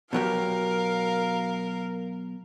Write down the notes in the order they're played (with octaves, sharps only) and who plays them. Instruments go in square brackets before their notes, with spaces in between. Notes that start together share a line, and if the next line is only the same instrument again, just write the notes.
[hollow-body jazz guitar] B2 F#3 G4 [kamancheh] A#4 F5